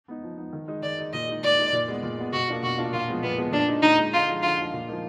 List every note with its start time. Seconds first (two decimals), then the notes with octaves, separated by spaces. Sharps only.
0.08 B3 D#4
0.23 F3
0.38 B3 D#4
0.53 D#3
0.68 G#3 D#4
0.83 D#3 D5
0.98 G#3 D#4
1.13 A#2 D#5
1.28 G#3 D#4
1.43 A#2 D5
1.58 G#3 D#4
1.73 A#2
1.88 G#3 B3
2.03 A#2
2.18 G#3 B3
2.33 B2 F#4
2.48 A#3 D4 F4
2.63 B2 F#4
2.78 A#3 D4 F4
2.93 A#2 F4
3.08 F3 G#3 B3
3.23 A#2 B3
3.38 F3 G#3 B3
3.52 A#2 D4
3.68 G#3 D#4
3.82 A#2 D#4
3.98 G#3 D#4
4.13 D3 F4
4.28 F3 G#3
4.43 D3 F4
4.58 F3 G#3
4.73 A#2
4.88 F3 A#3 D#4